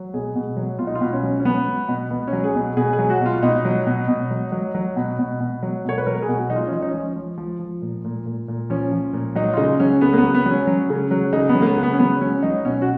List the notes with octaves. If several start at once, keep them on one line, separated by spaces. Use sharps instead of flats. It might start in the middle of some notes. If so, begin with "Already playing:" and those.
Already playing: F#3
B2 G#4
B2
F#3
B2 F4
D#4
F4
B2
C#4
F#3
C#4
F#3 B3
F#3
B2
B2 B3
C#4
F#3
G#4
B2
B2 G#4
G#4
F#3
F#4
B2 F4
B2 D#4
F#3
B2
B2
F#3
F#3
F#3
B2
B2
B2
F#3
B2 C#5
B4
F#3 A#4
G#4
B2
F#4
F#3 D#4
F4
C#4
F3 D#4
D#4
C#4
F3
F3
F3
F3
A#2
A#2
A#2
A#2
F3 C#4
F3
A#2
F#3 D#4
F4
C#3 D#4
F#3 C#4
C#3 B3
A#3
B3
F#3
B3
F#3
C#4
F#3
C#3
F#3
C#3 D#4
B3
F#3
A#3
B3
C#3
B3
C#4
F#3 B3
F#3 C#4
F#3 D#4
B2 C#4
F#4